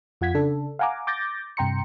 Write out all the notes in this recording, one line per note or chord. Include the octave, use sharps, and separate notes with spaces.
F2 F4 F#5 G#6 B6
C#3 D4 A4
F5 F#5 G#5 A#5 D6
D6 G6 A6 A#6
G2 C3 G5 A#5 C6 C#7